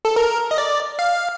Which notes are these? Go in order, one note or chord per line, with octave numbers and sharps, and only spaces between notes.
A4
A#4
D#5
D5
F5